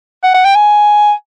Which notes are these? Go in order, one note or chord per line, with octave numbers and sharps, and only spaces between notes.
F#5
F#5
G5
G#5